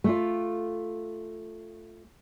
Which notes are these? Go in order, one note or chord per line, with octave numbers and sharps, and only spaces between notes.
A3 F4